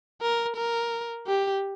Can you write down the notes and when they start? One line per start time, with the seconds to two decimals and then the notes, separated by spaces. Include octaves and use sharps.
0.22 A#4
0.56 A#4
1.27 G4